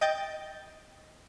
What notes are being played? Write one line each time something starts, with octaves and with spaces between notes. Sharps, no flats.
D#5 G5 G6 A6